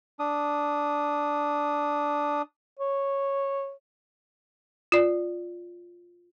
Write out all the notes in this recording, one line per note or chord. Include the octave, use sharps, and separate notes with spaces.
D4 D#6
C#5
F4 D5